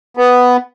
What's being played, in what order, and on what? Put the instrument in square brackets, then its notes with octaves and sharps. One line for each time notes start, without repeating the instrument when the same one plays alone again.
[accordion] B3